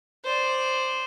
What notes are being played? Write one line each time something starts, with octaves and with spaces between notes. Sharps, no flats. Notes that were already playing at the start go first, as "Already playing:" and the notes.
C5 D5